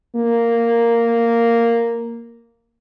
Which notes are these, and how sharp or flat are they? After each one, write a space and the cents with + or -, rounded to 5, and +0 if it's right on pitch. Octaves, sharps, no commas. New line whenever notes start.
A#3 -5